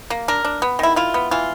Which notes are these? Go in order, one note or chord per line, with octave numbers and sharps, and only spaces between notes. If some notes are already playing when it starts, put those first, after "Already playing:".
A#3
D4 A#4
D4
B3
D#3 E4
E4 F4
B3
E3 F4